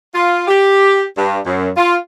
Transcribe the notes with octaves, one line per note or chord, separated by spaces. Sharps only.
F4
G4
G2
F#2
F4